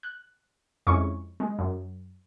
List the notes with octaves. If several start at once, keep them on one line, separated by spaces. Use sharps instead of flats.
F#6
F2 G#3 C#4 E4 C#6
G#3
F#2